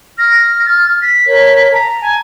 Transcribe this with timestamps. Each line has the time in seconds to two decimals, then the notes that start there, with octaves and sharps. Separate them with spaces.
0.18 F6 A#6
0.66 A6
1.02 B6
1.26 A#4 C#5
1.71 A5 A#5
2.01 G#5